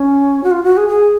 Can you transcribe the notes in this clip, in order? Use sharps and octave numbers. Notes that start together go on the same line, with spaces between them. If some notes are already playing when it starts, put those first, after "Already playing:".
Already playing: C#4
F#4
F4
F#4
G#4
G#4